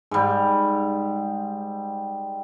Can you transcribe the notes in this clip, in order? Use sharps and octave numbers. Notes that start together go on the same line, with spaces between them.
G#2 G3